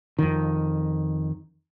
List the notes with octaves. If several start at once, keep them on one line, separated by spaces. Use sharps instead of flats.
F2 D#3